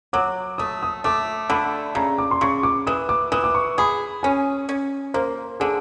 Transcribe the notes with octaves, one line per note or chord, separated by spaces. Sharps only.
F#3 D6
A3 D#6
D#6
A3 D6
D3 B5
C#3 A#5
D6
C6
C#3 C#6
D6
E3 D#6
D6
E3 D#6
D6
C#6
G#4 B5
C#4 G#5
C#4
A#3 C5
D3 G#4